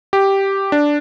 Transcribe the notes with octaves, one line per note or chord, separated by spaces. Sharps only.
G4
D4